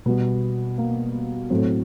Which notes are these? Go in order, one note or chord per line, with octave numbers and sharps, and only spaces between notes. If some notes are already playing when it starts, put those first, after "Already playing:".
B2 G3 B3
A#3
A2 F#3 C4